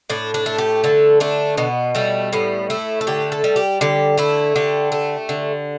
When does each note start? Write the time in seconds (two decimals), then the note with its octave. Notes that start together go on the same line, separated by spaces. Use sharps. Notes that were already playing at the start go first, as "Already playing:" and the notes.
0.10 A2 D4
0.34 D4
0.46 A3
0.58 G4
0.84 D3 A4
1.20 A3 D4
1.57 B2 B3
1.95 G3 A3
2.33 A2 B3
2.70 A3 E4
3.01 A4
3.07 D3 G4
3.32 A4
3.44 G3
3.56 G4
3.81 D3 G4
4.18 A3 E4
4.56 D3 G4
4.92 A3
5.29 D3